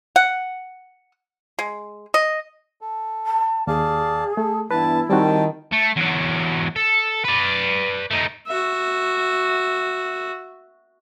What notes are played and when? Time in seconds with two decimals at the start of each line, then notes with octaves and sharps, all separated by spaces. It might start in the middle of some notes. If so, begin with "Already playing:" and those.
0.16 F#5
1.59 G#3
2.14 D#5
2.81 A4
3.26 A5
3.67 D#2 G#4 D5 F5 A5
4.37 A3 A4
4.71 G2 E3 B3 E4 B4 A5
5.10 D#3 G3 C4 F#4 G5 A5
5.72 A3
5.96 E2 F#3
6.76 A4
7.25 B4 D5
8.11 A3 D#4
8.47 F#4 E5